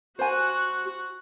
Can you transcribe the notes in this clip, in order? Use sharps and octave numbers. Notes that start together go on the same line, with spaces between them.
F#4 C5 F#5 G#5